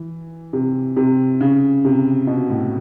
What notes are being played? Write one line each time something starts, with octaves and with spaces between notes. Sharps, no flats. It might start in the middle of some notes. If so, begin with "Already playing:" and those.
Already playing: E3
C3
C3
C#3
C3
B2
A2